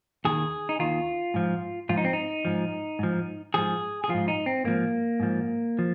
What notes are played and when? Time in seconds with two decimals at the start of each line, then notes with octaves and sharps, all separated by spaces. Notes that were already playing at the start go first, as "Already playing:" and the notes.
0.25 D#2 D#3 G#4
0.69 D#4
0.79 D#2 D#3 F4
1.34 G#2 F3
1.89 G#2 F3 F4
1.97 D#4
2.05 C4
2.13 D#4
2.45 G#2 F3
2.99 G#2 F3
3.54 G#2 F3 G#4
4.04 G#4
4.09 G#2 F3 F4
4.28 D#4
4.46 C4
4.64 G#2 F3 A#3
5.20 G#2 F3
5.79 F3